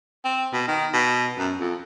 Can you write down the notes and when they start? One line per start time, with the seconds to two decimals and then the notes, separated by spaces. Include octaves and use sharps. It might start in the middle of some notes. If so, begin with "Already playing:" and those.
0.24 C4
0.53 B2
0.67 D#3
0.93 B2
1.38 F#2
1.60 F2